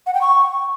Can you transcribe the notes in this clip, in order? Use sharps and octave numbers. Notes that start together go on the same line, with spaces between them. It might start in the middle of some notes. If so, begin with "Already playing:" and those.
F#5
G5
C#6